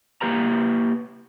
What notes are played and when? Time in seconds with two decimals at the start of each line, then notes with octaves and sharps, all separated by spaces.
0.21 A#3 G4 B4 A#5